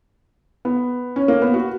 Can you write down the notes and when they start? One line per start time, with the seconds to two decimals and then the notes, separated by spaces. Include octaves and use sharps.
0.65 B3
1.16 C#4
1.28 A#3
1.42 B3
1.54 F#4